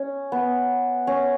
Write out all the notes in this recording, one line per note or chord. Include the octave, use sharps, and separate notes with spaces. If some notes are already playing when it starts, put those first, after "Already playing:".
Already playing: C#4
B3
C#4